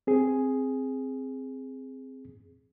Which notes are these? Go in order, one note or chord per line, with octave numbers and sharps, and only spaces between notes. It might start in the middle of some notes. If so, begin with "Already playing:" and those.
C4 G#4